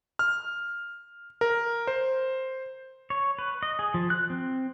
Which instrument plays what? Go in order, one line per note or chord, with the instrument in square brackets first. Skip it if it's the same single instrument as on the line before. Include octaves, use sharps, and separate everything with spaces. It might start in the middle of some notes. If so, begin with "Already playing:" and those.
[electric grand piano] F6
A#4
C5
[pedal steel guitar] C#5
B4
D#5
G#4
F3
F#6
C4